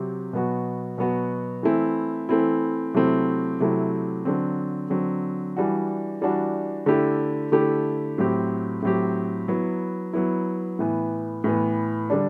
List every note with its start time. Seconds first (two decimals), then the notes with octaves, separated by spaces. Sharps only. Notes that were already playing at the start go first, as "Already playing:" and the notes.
Already playing: C3 F#3 C4 G4
0.33 B2 F#3 B3 F#4
0.98 B2 F#3 B3 F#4
1.63 E3 A3 C4 E4
2.29 E3 A3 C4 E4
2.94 C3 F#3 A3 C4 E4
3.60 C3 F#3 A3 C4 E4
4.25 D3 F#3 C4
4.90 D3 F#3 C4
5.57 E3 G3 D4 F#4
6.21 E3 G3 D4 F#4
6.86 D3 A3 E4 G4
7.52 D3 A3 E4 G4
8.18 A2 F#3 C4 G4
8.82 A2 F#3 C4 G4
9.48 F#3 B3 E4
10.13 F#3 B3 E4
10.79 A2 E3 B3
11.44 A2 E3 B3
12.10 D3 G3 D4